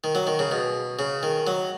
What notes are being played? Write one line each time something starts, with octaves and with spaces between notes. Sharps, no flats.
D#3
F#3
D#3
C#3
B2
C#3
D#3
F#3